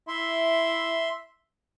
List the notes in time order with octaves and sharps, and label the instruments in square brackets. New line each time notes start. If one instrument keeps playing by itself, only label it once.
[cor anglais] E4 [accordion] E5 C6